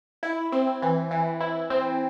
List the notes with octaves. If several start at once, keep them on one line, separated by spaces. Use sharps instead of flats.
E4
C4
E3
E3
E4
C4